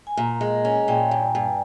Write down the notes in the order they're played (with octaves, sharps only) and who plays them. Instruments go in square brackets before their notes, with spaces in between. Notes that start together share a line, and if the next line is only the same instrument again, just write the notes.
[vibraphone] G#5
[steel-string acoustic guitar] A#2 [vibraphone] A#5
[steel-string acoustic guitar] G#3
[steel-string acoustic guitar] C#4 [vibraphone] G#5
[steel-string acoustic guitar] A#2 [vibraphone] G5
[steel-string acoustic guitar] G2
G2